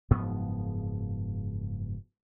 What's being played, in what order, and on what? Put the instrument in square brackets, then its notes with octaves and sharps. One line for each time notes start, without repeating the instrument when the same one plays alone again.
[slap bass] F#1 G#2 F3 B3